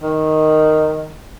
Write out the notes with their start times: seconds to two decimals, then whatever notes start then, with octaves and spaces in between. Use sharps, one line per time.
0.03 D#3